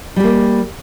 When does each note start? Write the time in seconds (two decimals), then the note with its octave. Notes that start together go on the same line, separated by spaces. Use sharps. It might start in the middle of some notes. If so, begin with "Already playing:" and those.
0.16 G3
0.20 G4
0.24 A#3